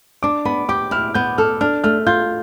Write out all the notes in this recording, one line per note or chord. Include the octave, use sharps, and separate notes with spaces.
D4 D6
B3 B5
G4 D6
E4 F6
B3 G6
A4 F6
D4 F6
A3 F6
F4 G6